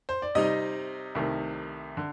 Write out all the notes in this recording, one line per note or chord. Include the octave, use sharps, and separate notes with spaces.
C5
D5
C3 G3 C4 D#4 D#5
C2 C3 D#3 A3
D3